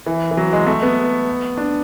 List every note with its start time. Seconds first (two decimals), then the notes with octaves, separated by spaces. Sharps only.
0.06 E3
0.31 E3
0.37 F#3
0.53 G#3
0.67 A3
0.83 B3
1.57 D4